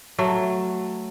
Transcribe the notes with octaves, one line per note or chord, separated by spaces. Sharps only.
F#3 A3